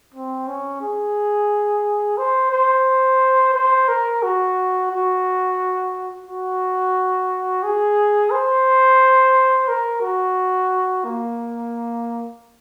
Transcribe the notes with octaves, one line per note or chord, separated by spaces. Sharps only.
C4
C#4
G#4
C5
C5
C5
A#4
F#4
F#4
F#4
G#4
C5
A#4
F#4
A#3